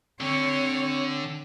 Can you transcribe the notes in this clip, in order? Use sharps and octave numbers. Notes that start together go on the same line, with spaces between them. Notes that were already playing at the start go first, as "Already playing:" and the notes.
D3 C4 C#5